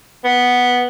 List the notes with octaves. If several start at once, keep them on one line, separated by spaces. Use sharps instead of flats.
B3